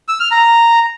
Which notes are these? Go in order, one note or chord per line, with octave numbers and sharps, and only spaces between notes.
E6
F6
A#5